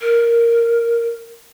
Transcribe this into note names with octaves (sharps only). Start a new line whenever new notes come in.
A#4